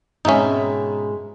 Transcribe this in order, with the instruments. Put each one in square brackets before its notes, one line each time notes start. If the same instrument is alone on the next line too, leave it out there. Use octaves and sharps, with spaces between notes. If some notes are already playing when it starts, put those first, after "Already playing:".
[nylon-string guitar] G#2 G#3 [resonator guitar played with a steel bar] B2 C4 E5 [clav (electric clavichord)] C#4 D#4